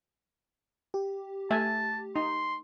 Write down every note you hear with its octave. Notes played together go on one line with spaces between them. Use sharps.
G4
A3 E5 G#5 A5
D#4 C6